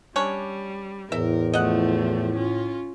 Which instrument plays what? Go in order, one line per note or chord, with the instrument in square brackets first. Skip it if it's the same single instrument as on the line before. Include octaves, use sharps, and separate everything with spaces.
[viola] G3 [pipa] C#4 D4 C#5
[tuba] E2 [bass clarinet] A2 [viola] A#4 [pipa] E5
[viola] F3 A3 [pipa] D#5 F#5
[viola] C#4 F4